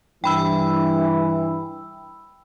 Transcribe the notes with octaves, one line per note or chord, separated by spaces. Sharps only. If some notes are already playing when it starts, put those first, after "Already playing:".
G2 E3 G5 B5 E6